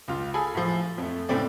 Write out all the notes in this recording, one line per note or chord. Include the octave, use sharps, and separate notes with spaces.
C#2 F4
G#4 A4 G#5 B5
A2 F3
F2 A3
A2 C#3 A3 C4 D5